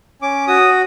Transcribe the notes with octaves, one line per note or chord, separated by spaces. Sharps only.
C#4 D6
F#4 D#6